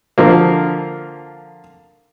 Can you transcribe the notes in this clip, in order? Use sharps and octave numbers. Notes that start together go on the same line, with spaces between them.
D3 F3 A#3